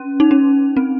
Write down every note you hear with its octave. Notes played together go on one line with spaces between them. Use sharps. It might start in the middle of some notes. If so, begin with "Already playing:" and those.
Already playing: C#4
D#4
C#4
C4